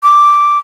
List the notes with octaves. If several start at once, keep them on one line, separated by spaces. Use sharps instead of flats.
D6